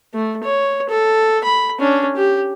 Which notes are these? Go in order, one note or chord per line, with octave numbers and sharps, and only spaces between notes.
A3
C#5
A4
B5
C#4 D4
G4